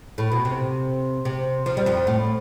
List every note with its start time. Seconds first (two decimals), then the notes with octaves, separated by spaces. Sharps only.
0.18 A2
0.32 B2
0.45 C3
1.25 C3
1.66 F3
1.77 G3
1.86 F2 F3
2.07 A2